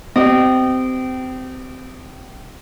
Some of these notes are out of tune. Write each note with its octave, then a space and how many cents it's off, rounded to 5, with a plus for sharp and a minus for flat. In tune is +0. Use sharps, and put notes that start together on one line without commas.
C4 -25 G4 -25 D#5 -25